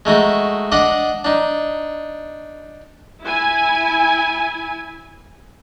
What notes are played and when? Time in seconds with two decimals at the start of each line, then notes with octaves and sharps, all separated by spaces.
0.05 G#3 A3 D#4 F#4
0.72 D4 D5 D#5 F#5
1.24 D4 D#4
3.21 E4 G#5